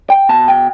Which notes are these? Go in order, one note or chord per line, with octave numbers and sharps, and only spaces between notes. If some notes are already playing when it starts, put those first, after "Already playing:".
G5
B2 A5
G5